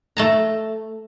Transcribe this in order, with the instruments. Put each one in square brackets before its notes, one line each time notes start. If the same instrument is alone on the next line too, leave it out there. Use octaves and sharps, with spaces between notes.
[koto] A3 A5 A#5